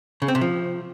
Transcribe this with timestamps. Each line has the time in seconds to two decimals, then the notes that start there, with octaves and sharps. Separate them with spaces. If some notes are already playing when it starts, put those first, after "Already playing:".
0.22 C#3
0.28 C4
0.35 C3
0.41 F3